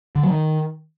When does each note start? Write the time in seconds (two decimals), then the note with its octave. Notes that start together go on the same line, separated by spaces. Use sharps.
0.16 D3
0.23 F#3
0.31 D#3